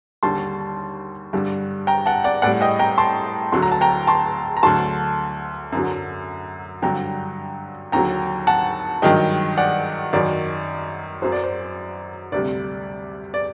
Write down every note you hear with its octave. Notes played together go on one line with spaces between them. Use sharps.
D#2 D3 G3 A5 C6
G2 D3 G3
G5 A#5
F#5 A5
D5 F#5
A2 D5 F#5
G3
D#5 G5
G5 A#5
A5 C6
D2 D3 F#3 C6
A#5
A5
G5 A#5
A5 C6
A#5
D2 D3 F#3 A5 C6
F#2 D3 F#3
G2 D3 F#3 G5 A#5
D#2 D3 F#3 G5 A#5
F#5 A5
G2 D#3 F#3 D#5 G5
D5 F#5
F#2 D#3 F#3 D5
F#2 F#3 C5
D5
C5
D2 C3 G3 D5
D5